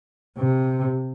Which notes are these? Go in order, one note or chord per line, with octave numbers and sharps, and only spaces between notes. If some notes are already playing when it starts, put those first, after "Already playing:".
C3